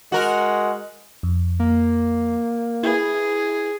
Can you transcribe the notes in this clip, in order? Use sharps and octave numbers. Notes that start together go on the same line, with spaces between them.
G#3 F#4 A#4
F2
A#3
E4 G#4 B4